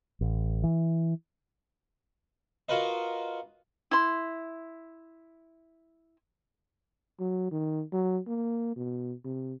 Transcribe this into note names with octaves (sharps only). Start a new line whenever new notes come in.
A1
E3
F4 F#4 A#4 B4 D#5
E4 C6
F#3
D#3
F#3
A#3
B2
C3